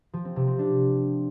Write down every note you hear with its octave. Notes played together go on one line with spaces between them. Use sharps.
F3
C4
C3
C4
D4